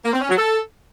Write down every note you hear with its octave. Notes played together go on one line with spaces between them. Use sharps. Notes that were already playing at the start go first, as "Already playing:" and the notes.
A#3
C4
C#4
F#3
A4